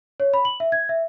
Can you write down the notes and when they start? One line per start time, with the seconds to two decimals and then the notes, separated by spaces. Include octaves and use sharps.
0.20 C#5
0.34 B5
0.45 F#7
0.60 E5
0.72 G#6
0.89 E5